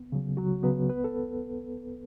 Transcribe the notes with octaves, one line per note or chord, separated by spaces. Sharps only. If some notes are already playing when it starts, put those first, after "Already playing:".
Already playing: C#2 B3
C#3 F#3
C#2 F#3 F#4
C#3 F#3 B3 B4
C#2 B3 B4
A4